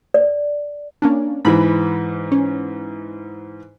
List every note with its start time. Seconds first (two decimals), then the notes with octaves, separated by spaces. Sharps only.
0.14 D5
1.02 A#3 C#4 D4
1.45 G#2 E3 B5
2.32 C#4